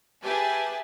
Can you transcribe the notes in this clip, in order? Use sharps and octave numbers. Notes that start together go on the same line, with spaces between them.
G4 G#4 B4 E5 G#5 A5